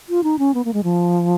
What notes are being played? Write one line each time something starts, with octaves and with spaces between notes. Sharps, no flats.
F4
D#4
C#4
B3
A#3
G#3
F3